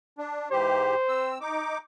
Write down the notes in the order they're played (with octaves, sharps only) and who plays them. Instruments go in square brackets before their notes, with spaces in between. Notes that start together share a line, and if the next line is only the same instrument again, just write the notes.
[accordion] D4
[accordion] G#2 E3 G4 [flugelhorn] C5
[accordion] C4 E6
D#4 D6